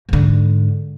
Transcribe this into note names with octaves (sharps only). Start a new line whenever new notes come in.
G#2 D3